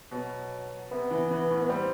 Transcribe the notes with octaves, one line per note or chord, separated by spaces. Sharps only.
B2 F#3
C3 B3
E3
E3
A2
B3
G3 C4